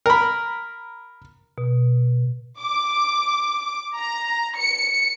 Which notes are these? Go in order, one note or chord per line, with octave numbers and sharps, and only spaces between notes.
A#4 B5
B2
D6
A#5
C#7